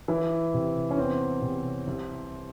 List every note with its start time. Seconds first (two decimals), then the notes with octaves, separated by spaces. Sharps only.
0.08 E3 E4
0.54 C3
0.91 C#4
0.97 E2 C4
1.42 C3
1.87 C2